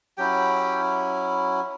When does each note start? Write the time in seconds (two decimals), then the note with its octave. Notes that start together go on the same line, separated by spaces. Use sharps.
0.17 F#3 C#4 E4 G4 G5